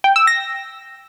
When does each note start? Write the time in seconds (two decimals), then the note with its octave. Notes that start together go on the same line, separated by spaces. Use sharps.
0.04 G5
0.16 E6
0.27 A#6